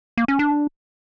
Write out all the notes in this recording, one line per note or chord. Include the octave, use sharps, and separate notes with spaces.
A#3
C#4
D4